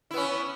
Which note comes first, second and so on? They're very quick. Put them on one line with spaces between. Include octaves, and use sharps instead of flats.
E4 B3 C#4